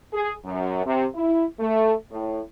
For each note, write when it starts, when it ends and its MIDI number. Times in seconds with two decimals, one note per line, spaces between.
0.13 0.33 68
0.45 0.85 42
0.86 1.06 48
1.15 1.45 64
1.60 1.94 57
2.11 2.41 45